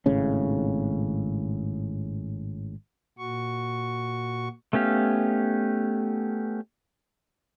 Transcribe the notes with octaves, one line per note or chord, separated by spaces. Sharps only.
G#1 A2 C#3 C#4
A#2 F#4 C#6
A3 B3 C#4 G4 F5